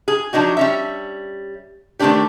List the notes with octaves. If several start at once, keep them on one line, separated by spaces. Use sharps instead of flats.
G#4
F3 F#3 D4 D#4 F#4
G3 C#4 E5
D#3 A3 A#3 C4 D4 G4